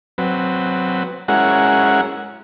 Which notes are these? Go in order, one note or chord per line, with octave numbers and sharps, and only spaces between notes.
F#3 C4 B4
G#3 C#4 E4 F#4 A#4 F#5